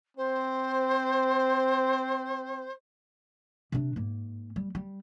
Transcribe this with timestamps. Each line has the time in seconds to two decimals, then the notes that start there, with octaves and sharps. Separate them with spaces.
0.17 C4 C5
3.72 C3 D4
3.96 G#2 A#3
4.56 G3
4.75 G3